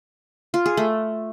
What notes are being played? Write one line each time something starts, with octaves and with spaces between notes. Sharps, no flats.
F4
G#4
A3